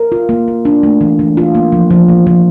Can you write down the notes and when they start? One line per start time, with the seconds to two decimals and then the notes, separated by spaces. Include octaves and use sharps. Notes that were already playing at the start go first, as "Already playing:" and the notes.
Already playing: A#4
0.12 F4
0.29 A#3
0.48 A#3
0.65 D4
0.83 A3
1.01 E3
1.19 E3
1.37 F4
1.55 A#3
1.72 F3
1.91 F3
2.08 A#3
2.27 F3